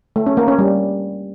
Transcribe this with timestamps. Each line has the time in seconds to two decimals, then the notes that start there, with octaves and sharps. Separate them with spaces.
0.16 A3
0.27 C#4
0.37 A#3
0.48 C#4
0.58 G3